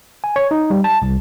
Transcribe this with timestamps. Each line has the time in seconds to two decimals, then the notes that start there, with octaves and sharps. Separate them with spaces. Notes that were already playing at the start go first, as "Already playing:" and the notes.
0.24 G#5
0.36 C#5
0.51 D#4
0.70 G3
0.84 A5
1.02 C2